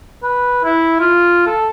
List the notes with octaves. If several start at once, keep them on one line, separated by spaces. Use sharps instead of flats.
B4
E4
F4
A4